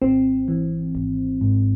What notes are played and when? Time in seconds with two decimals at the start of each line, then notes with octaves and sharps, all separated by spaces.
0.02 G#1 C4
0.48 E3
0.95 G#1
1.41 G#2